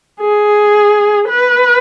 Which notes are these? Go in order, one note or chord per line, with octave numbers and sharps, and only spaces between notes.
G#4
B4